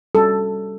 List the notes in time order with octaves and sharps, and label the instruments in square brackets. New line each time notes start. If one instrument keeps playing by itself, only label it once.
[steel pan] G3 C#4 F#4 A4